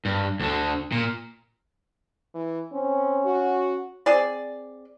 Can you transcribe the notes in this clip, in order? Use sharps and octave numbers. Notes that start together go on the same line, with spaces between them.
G2
D2 D3
A#2
E3
C4 C#4
F#4
C4 G#4 D5